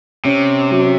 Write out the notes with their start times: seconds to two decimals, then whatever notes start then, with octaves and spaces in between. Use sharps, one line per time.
0.25 C3 C#4
0.71 F#3